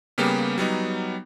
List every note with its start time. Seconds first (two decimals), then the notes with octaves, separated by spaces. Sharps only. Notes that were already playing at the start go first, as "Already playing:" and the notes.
0.18 C#3 G3 A#3 B3 G4
0.58 F#3 G3 B3 D#4